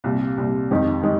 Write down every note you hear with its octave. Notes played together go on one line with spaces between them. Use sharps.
C2 A#2 G3
C2 A#2 G3
F2 D#3 G#3 D#4 G4
D#3 G#3 D#4 G4